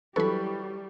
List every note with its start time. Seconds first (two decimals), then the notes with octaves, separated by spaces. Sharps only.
0.16 F#3 G3 E4 A4 B4 B5 C#6